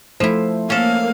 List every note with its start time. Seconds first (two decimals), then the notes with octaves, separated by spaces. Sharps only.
0.20 F3 A3 E4 C5
0.70 A#3 C#4 A4 F5